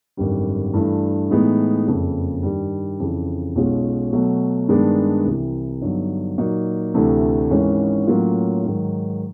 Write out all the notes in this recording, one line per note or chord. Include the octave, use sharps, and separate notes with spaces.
G#1 F#2 D3 G3
G2 E3 A3 D4
A2 E3 G#3 B3 D#4
F#1 F2 C#3
G2 D#3 G3
F2 C#3 E3
B1 B2 G#3 C#4 F4
B2 F#3 A3
G2 D#3 G#3 B3 D4
C2 C3 E3
G2 D3 F#3 B3 D#4
A#2 F#3 A#3 D#4 F#4
D2 C3 E3 A3 D4
G#1 G#2 E3 G#3 C#4
A2 F#3 A#3 C#4 F4
G#2 D#3 F#3